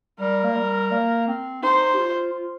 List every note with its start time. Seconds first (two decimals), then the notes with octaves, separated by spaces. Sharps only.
0.20 G3 A#4
0.44 A#3
0.56 G3
0.91 A#3
1.28 C4
1.63 D#4 C5
1.94 G4
1.98 F4
2.33 F4